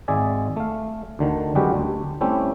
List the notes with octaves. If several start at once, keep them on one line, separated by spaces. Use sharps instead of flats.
G#1 G#3 G#4 D5 E5 G#5
A3 F5
D2 D3 D#3
F#2 G3 G#3 F#4 G4 B4
D2
G3 A3 C4 C#4 E4 G4